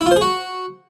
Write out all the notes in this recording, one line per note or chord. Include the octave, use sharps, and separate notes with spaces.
E4
F4
C5
G#4
F#4